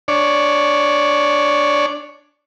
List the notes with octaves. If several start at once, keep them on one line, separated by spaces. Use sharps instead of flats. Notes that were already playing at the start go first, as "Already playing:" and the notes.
D4 C#5 D5